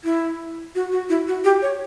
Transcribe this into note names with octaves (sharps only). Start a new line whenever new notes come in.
E4
F#4
F#4
E4
F#4
G4
C#5